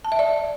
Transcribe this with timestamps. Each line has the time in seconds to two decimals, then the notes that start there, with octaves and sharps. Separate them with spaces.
0.05 A5
0.12 E5
0.19 D5